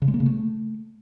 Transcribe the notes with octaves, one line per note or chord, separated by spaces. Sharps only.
C#3
G#3
A#3
C#3
A3